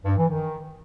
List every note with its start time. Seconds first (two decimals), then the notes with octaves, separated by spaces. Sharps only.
0.05 G2
0.17 E3
0.29 D#3